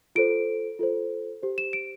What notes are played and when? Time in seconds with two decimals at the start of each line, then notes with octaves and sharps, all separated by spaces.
0.15 F4 A4 C5 D7
0.79 F4 A4 C5
1.42 G4 C5
1.58 E7
1.73 D7